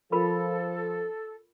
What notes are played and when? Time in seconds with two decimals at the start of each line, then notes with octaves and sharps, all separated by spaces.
0.12 F3 F4 A4 A#4 B5